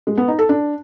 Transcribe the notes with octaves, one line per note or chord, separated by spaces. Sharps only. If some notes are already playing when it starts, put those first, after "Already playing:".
G#3
B3
D#4
A4
D4